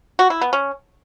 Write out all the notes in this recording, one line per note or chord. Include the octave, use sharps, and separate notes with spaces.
F#4
E4
B3
C#4